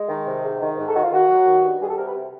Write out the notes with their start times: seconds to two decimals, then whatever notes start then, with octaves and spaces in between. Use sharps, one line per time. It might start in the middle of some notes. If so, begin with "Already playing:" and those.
Already playing: G#3
0.09 D#3
0.27 C3
0.43 G#2
0.61 D#3
0.77 G#2
0.87 A4
0.94 D#3 F#4
1.03 F4
1.12 D#3 F#4
1.28 F#3
1.45 D#3
1.63 G2
1.80 G3 G#4
1.88 A4
1.96 C3 A#4
2.06 B4
2.14 C3